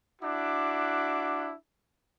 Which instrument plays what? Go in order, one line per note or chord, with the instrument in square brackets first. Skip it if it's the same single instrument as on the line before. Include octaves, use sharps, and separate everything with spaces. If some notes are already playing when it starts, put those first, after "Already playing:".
[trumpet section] D4 E4 F#4 D6